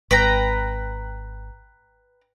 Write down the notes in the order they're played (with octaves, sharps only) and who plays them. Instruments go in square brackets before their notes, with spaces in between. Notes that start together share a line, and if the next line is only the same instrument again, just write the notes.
[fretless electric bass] G#1 [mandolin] B4 G5 A#5